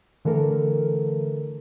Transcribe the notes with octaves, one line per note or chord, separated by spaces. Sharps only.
D3 E3 A3 A4 A#4